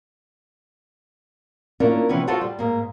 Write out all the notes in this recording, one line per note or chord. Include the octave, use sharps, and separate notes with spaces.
A#3 C#4 D4 E4 F4 A#4
C3 E3 F3 B3 C#4
F4 F#4 A4 C5 F#5
G3
G#2 A#3